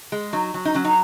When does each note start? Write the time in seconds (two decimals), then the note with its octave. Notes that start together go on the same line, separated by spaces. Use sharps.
0.12 G#3
0.33 F#3 D#4
0.54 F#3
0.65 D#4
0.74 F#3 C#4
0.85 D#4